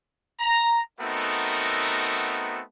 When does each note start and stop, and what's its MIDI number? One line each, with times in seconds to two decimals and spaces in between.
0.40 0.80 82
1.01 2.61 57
1.01 2.61 59
1.01 2.61 60
1.01 2.61 63
1.01 2.61 66
1.01 2.61 70